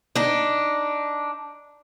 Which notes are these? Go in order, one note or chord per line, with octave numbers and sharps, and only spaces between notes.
D4 D#4